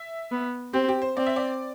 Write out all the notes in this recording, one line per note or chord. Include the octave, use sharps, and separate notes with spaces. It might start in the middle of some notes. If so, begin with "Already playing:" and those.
Already playing: E5
B3
C4 G4
G4
C5
C4 D5
E5
D5